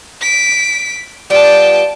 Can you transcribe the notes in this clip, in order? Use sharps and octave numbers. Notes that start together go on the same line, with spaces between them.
B6 D7
G3 B3 F4 G5 A5